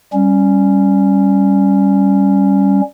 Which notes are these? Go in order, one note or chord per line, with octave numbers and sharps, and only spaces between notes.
G3 C#4